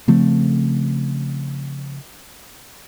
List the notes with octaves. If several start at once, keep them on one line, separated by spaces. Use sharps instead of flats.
C#3 F3 A3 C4